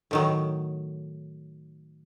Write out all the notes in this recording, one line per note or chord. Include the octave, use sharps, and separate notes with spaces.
A2 D#3 F#3